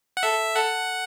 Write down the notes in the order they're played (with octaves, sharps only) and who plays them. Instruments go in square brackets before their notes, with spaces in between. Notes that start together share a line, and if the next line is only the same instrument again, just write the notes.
[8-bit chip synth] F#5
[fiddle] A4 [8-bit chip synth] E5
[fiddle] A4 [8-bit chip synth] F#5